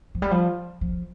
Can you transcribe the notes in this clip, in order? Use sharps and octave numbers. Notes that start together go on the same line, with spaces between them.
F3
G3
F3
F3